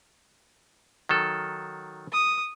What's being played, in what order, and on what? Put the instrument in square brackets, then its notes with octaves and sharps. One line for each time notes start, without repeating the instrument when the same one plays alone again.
[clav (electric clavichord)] D#3 F#3 A4
[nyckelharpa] D#6